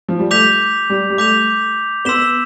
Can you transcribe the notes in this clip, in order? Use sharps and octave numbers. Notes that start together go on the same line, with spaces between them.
F3
G3
A3 D6 G6 B6 F7
G3
G3
A3 D6 G6 B6 F7
B3 C6 E6 B6 E7 G7